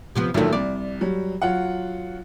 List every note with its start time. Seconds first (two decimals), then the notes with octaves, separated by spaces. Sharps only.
0.15 C3 F3 B3
0.34 D2 A#2 D#3 F#3 A3
0.53 C2 D5
1.01 F#3 G3
1.42 F#3 F4 F#5